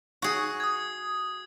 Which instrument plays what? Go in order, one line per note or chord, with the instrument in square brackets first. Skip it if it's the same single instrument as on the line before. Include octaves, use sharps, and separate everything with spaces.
[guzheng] F#4 G#4
[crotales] D#6 G#6